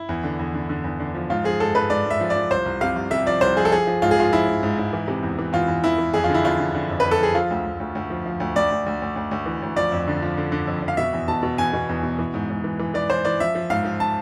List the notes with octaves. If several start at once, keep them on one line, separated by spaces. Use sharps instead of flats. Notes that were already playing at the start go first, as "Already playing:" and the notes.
Already playing: E4
E2
D3
E2
D3
D3
E2
D3
F3
G#2 F4
F3 G#4
G#2 A4
G#2 B4
G#2 D5
G#2 E5
F3
D5
F3
C2 C5
C2
C3 F5
C2
C3 E5
F3 D5
C2 C5
F3 G#4
A4
F3 G#4
F3
G#2 F4
G#4
F3 F4
F3 E4
G#2
G#2
G#2
E3
C3
E2
E3
E2 F4
E2
E2 E4
E3
F2 G#4
F4
D3
E4
F2 F4
D3
D3
F2
F2 B4
A4
F3 G#4
F3 F4
D2
D2
D2
D2
F3
F3
D2
D2 D5
D2
D2
D2
D2
D2
E3
D2
F3 D5
F2
D3
F3
D3
D3
F2
F2
F5
B2 E5
E2
B2 A5
B2
E2 G#5
B2
E2
B2
E3
G#2
G#2
E3
E3
E3 D5
E3 C5
E3 D5
F3 E5
F3
G#2 F5
F3
A5